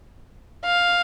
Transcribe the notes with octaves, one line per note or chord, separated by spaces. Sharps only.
F5